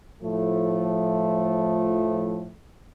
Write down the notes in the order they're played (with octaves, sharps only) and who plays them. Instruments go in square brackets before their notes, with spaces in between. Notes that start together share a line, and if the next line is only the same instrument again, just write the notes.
[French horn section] A2 F3 A3